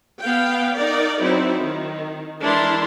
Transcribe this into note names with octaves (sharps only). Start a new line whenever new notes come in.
B3 F5 G5
D#4 A#4 D5
F#3 C4 D#4 E4
D#3
E3 G#3 D4 E4 A#4 C6